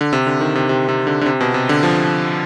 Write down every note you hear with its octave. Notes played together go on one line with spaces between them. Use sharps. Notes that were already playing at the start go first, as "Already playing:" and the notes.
D3
C3
D3
D#3
C3
C3
C3
D3
D3
C3
B2
C3
D3
F3